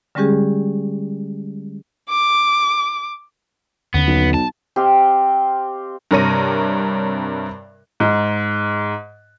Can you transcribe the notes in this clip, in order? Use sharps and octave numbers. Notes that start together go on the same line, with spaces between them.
D3 G3 G#3 C#4 G4 G#4
D6
D#2 D3 B3 C#4
B1
A5
C4 G4 D#5 F5
G2 C3 A#4 C#5 A#6 D#7
G#2